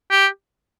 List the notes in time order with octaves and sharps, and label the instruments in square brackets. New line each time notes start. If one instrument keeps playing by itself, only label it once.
[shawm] G4